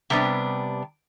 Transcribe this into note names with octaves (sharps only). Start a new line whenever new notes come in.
C3 G3 B3 D4